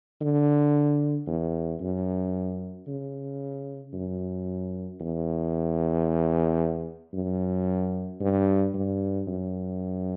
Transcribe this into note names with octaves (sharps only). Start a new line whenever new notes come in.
D3
E2
F#2
C#3
F#2
E2
F#2
G2
G2
F#2